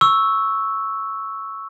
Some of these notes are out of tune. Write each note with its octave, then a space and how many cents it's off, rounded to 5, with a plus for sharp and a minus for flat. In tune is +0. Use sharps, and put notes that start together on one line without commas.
C#6 +0 E6 -5